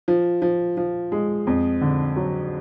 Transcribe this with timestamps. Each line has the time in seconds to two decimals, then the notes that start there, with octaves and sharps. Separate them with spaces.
0.08 F3
0.42 F3
0.77 F3
1.12 G#3
1.47 F2
1.81 D3
2.16 F#3